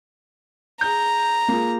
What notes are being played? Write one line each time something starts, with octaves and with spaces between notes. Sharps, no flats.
G#4 A#5 G6
A#3 F4 G#4